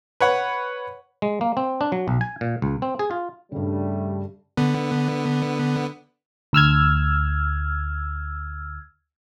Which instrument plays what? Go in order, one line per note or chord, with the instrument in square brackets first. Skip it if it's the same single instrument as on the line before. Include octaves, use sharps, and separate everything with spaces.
[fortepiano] B4 C#5 F#5
[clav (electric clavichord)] G#3
A#3
C4
D4
F#3
B1
G#5
A#2
C#2
C4
G#4
F4
[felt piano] G2 C#3 [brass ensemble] G3 A3
[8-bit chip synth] D3 B3
[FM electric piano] D2 E6 F6 G#6